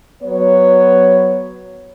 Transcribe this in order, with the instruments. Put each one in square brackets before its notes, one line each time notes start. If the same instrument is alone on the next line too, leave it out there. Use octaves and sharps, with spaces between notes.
[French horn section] F#3 B3 C#5